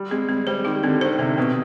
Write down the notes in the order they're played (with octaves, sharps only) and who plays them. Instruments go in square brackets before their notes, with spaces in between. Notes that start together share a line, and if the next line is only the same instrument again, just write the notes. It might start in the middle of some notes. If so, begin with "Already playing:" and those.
Already playing: [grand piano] G3
[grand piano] G#3 [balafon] C4
[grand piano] G3 [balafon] C4
[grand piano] G3 [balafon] C5
[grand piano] D#3 [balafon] G4
[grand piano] D3 [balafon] C4
[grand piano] D#3 [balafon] C5
[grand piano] C3 [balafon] C4
[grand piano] B2 [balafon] C4